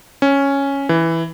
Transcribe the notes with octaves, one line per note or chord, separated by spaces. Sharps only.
C#4
E3